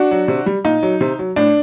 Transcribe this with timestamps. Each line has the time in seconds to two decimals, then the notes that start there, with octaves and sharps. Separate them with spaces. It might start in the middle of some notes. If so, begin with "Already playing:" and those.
Already playing: D4 F#4
0.11 F#3
0.28 C3
0.46 G3
0.64 A#2 D#4
0.83 F#3
1.01 C3
1.19 F#3
1.36 A2 D4